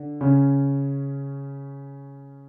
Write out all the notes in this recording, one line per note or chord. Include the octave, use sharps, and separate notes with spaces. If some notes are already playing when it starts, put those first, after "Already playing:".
Already playing: D3
C#3 C#4